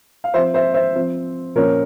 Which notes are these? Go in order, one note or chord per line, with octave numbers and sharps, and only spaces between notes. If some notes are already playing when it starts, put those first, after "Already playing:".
F5
F3 C4 C5 E5
C5 E5
C5 E5
F3 C4
A#2 F3 A#3 C#4 A#4 C#5